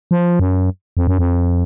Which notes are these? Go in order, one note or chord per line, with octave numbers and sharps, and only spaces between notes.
F3
F#2
F2
F#2
F2